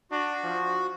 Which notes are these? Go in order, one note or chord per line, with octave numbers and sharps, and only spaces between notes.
D4 F#4
F3